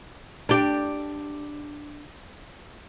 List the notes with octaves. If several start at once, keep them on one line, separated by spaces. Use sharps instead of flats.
D4 G4